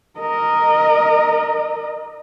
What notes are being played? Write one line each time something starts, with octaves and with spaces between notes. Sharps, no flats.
A#4 D#5